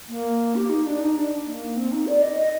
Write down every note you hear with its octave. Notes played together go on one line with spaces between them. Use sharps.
A#3
G4
D#4
D4
D#4
D4
A#3
C4
D#4
D5
D#5
D#5